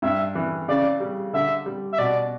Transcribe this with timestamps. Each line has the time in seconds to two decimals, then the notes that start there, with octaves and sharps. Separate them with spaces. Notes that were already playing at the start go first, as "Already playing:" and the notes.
0.02 G2 E5
0.35 E3
0.68 C#3 D5
1.00 G3
1.33 D3 E5
1.66 G3
1.93 E5
1.99 B2 D5